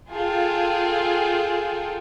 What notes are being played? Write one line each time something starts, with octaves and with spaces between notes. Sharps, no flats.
F4 G#4 A4 G5